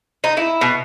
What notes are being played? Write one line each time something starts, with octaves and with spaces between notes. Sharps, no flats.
D#4
E4
B2